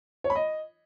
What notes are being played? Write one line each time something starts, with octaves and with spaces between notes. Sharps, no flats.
C#5
B5
D#5